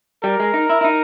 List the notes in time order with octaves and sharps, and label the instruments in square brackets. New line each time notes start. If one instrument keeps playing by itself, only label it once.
[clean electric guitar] G3 [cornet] A#4
[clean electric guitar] G#3
D#4
E4
E4
D#4